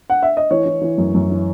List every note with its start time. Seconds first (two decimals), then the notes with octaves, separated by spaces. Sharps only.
0.10 F#5
0.23 E5
0.37 D#5
0.51 E3 C#5
0.66 E3
0.82 E3
0.98 F#2
1.14 F#2
1.30 E3